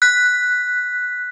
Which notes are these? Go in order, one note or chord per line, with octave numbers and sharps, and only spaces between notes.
F#6 B6